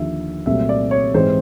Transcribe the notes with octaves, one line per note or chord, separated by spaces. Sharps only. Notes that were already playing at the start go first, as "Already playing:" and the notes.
Already playing: D#2 D3 F3 E5
C2 A#2 F#3 A3 C4 E5
D5
C#5
G#2 E3 G#3 C4 C5